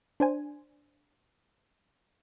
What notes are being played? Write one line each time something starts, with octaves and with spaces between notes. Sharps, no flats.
D4 C5 G#5